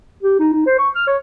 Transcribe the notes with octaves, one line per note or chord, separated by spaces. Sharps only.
G4
D#4
D#4
C5
C#6
F6
C#5